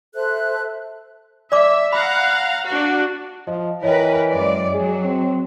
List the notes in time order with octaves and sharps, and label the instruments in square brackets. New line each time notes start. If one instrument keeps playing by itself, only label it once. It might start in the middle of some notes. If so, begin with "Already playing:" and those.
[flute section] A4 C5 E5 F#6
[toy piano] D5 D6 [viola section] E5
[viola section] F5 F#5 A#5 [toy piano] B5
[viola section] D4 F#4
[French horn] F3 [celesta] D#5
[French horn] E3 [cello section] A#4 B4 [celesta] C#5 D#5 G5
[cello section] F#2 G#3 D5
[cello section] F#3 [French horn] G#4
[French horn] C4